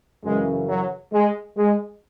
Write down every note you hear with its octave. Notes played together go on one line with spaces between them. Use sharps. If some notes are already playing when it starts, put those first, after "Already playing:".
F#2 C#3 E3 G#3
F#3
G#3
G#3